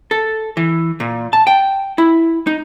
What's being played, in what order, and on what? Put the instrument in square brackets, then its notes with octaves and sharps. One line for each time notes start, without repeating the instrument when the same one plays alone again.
[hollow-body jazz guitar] A4
E3
A#2
A5
G5
E4
D#4